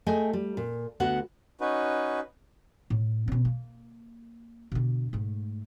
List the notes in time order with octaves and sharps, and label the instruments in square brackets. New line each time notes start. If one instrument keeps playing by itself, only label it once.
[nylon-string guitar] A3 G#4 D#5 G5 G#5
G3
A#2
D2 B3 F#4 F#5
[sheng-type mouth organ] C#4 D#4 F#4 B4
[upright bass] A2
B2 C#4
A#3
B2 D3
G#2 A3